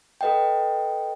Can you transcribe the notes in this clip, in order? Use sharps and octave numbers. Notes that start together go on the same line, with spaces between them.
A4 B4 D#5 F#5 G5